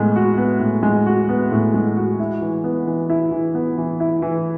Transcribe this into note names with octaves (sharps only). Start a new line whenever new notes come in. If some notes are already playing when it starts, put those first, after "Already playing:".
Already playing: A2 G#3 B3
F#4
B3
A2
G#3
F#4
B3
A2
G#3
F#4
E4
E3
B3
E3
E4
E3
B3
E3
E4
E3